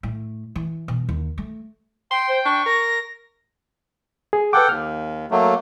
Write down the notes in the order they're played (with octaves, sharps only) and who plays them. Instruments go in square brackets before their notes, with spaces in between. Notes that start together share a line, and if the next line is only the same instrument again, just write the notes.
[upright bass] A2
E3
B2
D#2
A3
[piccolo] G5 [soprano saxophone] C6
[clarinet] C5
[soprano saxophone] D4 [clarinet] C#6
[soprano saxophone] A#4 [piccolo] A#6
[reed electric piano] G#4
[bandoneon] A4 F#5 G5 [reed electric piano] B4 D6
[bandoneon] D#2 [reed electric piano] F6
[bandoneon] F#3 A3 A#3